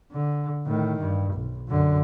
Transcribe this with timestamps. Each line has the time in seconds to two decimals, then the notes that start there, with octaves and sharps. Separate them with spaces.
0.12 D3
0.66 A2 D#3
1.00 G2
1.34 B1
1.68 F#2 D3